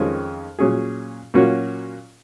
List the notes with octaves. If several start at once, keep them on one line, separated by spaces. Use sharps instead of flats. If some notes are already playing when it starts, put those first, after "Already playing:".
Already playing: F2 D#3 G#3 C#4
A#2 F#3 C#4 G#4
A#2 F#3 A#3 C#4 F#4